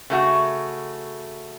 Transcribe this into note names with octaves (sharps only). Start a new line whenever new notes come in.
C#3 A3 F#4